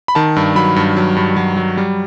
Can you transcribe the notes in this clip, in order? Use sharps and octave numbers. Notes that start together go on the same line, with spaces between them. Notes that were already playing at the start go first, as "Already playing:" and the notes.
B5
D#3 A5
G2
F#3 B5
G2
F#3
G2
F#3
F#3
G3